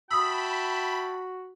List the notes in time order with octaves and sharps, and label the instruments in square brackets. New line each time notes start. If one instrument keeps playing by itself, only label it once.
[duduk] F#4 [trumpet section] E5 G5 A5 [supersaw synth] B5 [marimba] D#6 E6